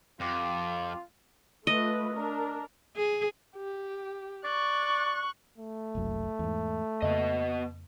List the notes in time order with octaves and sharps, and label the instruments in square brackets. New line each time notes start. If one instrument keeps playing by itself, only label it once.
[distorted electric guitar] F2 [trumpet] F4 [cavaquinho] G4 F#5 D6
[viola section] A3 F4 B4 [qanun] D#5
[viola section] D4 A#4
[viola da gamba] G#4
[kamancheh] G4
[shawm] D5 [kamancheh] C#6 F#6
[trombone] A3
[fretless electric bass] F#1 C2 F#2
E2 G#2
[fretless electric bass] F2 C#3 A#3 [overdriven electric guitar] B3 D#5